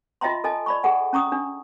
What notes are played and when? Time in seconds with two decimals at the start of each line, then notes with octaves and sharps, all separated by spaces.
0.21 F4 D#5 E5 G5 A#5 C6
0.44 A4 D#5 G#5 A5
0.66 D5 B5 C#6
0.84 G#4 A4 F#5 G#5
1.13 C#4 A#5 C#6 D#6
1.32 D4